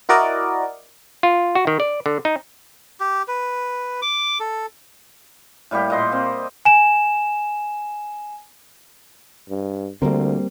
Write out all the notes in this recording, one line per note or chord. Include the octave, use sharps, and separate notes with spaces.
E4 F#4 A#4 D5 D#5
F4
F#4
D#3
D5
D3
D#4
G4
B4
D6
A4
A2 G3 A#3 G4
A#2 D#5 C6
C4
G#5 E7
G2
D2 D3 G3 A#3 C4 A#4